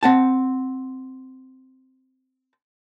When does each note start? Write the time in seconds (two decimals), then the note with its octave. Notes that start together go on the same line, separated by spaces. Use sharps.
0.03 C4 F#5 A5